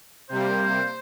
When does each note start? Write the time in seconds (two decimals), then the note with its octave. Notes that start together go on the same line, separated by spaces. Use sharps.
0.29 C3 G3 A#3 C5